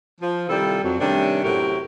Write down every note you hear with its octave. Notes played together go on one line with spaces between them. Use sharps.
F3
C3 D#3 G3 E4 F4 A4
F2 F#3
C3 D#3 G3 A3 C#4 D4
F#2 A2 C3 F#4 G4 A#4